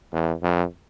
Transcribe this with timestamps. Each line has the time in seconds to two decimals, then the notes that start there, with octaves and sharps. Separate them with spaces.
0.13 E2
0.42 F2